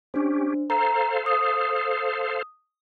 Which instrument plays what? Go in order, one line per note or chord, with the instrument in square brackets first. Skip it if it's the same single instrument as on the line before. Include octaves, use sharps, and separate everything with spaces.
[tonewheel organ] C#4 G4 [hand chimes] D4 C5
[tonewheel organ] A4 C5 F5 [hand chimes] A#5
[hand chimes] D#6